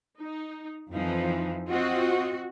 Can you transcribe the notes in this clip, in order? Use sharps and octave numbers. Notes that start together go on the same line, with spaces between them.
D#4
F2 E3 F3 D#4
C4 F4 F#4 D#5